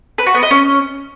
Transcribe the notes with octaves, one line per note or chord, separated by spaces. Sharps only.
B4
F#4
B3
D#5
C#4